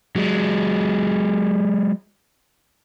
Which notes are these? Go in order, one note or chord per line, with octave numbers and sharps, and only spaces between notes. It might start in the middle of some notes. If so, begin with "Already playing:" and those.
F#3 G#3